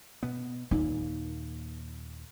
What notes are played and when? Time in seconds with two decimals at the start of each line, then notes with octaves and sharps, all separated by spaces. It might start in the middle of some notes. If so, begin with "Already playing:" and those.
0.23 B2 B3
0.71 D#2 A#2 D#4